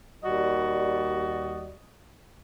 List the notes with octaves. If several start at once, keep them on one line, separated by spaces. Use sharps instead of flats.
D#2 G3 F#4 D5 D#5